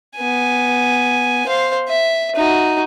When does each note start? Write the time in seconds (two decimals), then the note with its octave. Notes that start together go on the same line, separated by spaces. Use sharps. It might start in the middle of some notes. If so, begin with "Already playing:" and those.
0.17 B3 G#5
1.47 C5 F5
1.88 E5
2.36 D#4 F#4